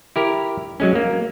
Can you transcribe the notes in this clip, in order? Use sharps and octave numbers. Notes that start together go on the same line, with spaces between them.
E4 G4 A#4
F#3 G#3 C#4
A#3